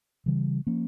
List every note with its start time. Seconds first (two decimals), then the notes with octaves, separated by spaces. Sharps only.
0.26 C#3 E3 G3
0.67 F3 A#3 C#4